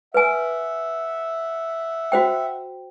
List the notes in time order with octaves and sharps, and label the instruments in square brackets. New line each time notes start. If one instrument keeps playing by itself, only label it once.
[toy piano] B4 G#5 [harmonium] E5 F#5
[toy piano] F#4 C5 G5